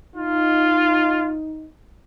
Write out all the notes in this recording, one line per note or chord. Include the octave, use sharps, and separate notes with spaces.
D#4 F4